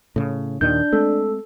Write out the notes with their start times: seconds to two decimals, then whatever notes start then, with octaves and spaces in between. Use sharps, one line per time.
0.16 A2 C#3
0.61 D#2 A#2 D#3 D4 G6
0.93 G#3 A3 C4 A4